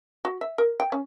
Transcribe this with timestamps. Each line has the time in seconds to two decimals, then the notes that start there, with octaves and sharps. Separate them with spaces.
0.25 F#4
0.41 E5
0.58 A#4
0.80 G5
0.92 C#4